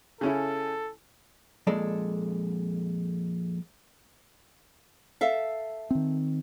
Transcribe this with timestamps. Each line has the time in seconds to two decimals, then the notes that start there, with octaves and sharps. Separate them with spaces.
0.21 C#3 C#4 E4 A4
1.67 F2 A#2 G#3 A4 D5
5.21 A4 E5 F5
5.90 D#3 C4